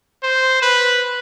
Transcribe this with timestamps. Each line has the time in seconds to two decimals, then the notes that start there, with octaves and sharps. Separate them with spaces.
0.23 C5
0.62 B4